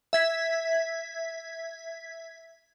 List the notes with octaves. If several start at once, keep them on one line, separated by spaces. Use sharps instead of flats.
E5 G#6 B6